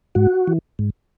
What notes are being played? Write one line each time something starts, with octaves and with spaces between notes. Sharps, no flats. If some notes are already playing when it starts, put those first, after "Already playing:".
G#2 F#4
E3
G#2